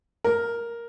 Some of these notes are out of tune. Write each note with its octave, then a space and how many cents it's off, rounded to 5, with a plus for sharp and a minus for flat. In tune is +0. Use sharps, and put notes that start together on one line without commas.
A#4 +5